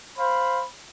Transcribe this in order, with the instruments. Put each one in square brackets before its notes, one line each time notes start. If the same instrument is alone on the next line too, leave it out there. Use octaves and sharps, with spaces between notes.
[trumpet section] C5 F5 B5